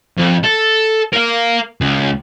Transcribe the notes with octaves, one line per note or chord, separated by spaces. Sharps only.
F2
A4
A#4 F5
C#2